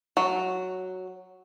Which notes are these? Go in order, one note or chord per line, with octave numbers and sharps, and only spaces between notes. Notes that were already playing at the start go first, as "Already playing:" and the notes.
F#3